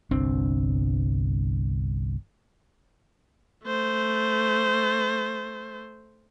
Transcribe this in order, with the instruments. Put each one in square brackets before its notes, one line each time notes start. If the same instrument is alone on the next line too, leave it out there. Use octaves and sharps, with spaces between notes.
[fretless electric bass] G1 C2 C4 D4
[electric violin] A3 C5